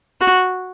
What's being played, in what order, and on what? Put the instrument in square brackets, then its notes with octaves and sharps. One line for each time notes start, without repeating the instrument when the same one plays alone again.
[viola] F#4